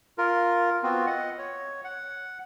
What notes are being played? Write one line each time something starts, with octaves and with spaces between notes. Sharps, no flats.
F4 A#4
B3 C4 F4 F#4
D#5 F#5
C#5
F#5